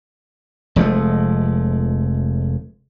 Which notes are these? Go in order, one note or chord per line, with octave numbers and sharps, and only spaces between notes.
F1 F3 G#3 A3